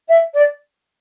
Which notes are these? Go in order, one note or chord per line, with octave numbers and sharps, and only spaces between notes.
E5
D5